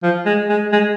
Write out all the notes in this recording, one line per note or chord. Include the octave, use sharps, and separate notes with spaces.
F3
G#3
G#3
G#3